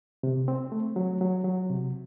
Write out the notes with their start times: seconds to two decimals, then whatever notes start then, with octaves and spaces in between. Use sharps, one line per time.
0.23 C3
0.48 C4
0.72 A3
0.96 F#3
1.21 F#3
1.44 F#3
1.69 C3